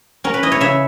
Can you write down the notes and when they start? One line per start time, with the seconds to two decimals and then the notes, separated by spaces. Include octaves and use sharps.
0.24 C#4 A#4
0.34 B4
0.43 E4 D#5
0.52 C#5
0.61 C#3 E5